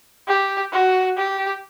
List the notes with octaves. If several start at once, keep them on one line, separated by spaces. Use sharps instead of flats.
G4
F#4
G4